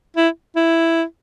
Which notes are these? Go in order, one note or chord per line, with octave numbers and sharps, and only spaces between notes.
E4
E4